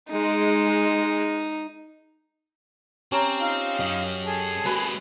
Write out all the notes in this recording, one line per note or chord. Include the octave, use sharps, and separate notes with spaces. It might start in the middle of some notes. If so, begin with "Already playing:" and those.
G#3 D#4
C4 C#4 G4 A5 A#5
D#4 F4 F5
F#2 F#3 D#5
G#4 A4 A5
G#3 A#3 F#4 B4